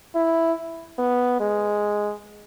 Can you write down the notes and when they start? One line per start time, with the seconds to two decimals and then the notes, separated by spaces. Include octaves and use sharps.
0.15 E4
0.98 B3
1.40 G#3